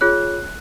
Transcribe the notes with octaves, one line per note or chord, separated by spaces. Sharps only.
F4 G#4 C#5 F#6